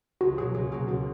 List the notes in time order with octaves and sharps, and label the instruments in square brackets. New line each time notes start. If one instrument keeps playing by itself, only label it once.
[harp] C#2 [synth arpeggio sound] F#4
[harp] B2 F#3 A#3 [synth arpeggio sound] G#4
[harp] C#2 [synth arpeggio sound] G#4
[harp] B2 F#3 A#3
[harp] C#2 [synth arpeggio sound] F#4